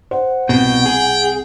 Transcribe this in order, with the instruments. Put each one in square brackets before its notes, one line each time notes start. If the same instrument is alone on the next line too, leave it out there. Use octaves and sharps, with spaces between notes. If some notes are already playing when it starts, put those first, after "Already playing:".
[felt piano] C5 [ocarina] F#5
[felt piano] C2 [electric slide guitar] B2 [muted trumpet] G5
[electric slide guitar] G#4